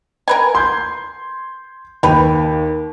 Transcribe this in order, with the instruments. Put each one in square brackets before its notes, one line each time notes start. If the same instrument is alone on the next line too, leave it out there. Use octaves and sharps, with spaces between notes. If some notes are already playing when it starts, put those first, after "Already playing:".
[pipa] A#4 B4 G#5
[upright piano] C6 G6 G#6
[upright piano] D#2 [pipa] G4 B4